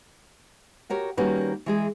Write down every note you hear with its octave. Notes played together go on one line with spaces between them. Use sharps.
F#4 G4 A#4 C#5
D#3 G3 A#3 C#4 F#4 B4
E3 G#3 G#4